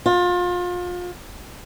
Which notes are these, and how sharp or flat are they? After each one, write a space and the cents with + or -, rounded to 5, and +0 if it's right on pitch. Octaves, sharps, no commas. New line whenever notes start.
F4 +30